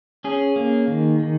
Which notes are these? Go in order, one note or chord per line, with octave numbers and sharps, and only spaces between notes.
C#4 G#4
A#3
D#3
D#3